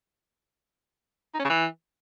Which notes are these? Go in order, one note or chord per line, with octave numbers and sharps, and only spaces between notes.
D#4
C#4
C#3
E3